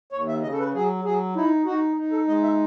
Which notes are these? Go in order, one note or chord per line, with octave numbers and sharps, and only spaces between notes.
D#2 C#5
E5
C#3 D#5
A4
B4
F#3 G#4
F#3 G#4
D#4 E4
D#4 F#4
D#4
A4
G#3 D#5
E5